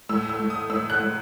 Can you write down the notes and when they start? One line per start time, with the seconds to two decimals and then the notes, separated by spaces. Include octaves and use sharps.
0.09 A2 E6
0.29 E6
0.39 A2
0.50 D#6
0.70 A2 E6
0.90 F#6
1.00 A2